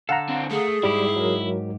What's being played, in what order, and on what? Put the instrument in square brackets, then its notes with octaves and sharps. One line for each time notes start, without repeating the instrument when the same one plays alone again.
[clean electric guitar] D3 A4 [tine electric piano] F5 F#5 A#5
[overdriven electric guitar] C4 D4
[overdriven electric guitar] A3 [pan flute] G#4
[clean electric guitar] G#2 G4 [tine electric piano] G3 [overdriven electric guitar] E4
[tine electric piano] F#3 A#4